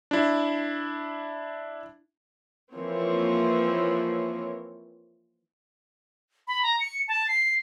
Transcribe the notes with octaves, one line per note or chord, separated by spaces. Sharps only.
D4 E4
E3 F3 A#3 C4 A#4 C#5
B5
A#5
C#7
A5
C7